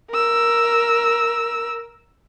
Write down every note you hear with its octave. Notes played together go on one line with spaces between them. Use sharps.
A#4 E6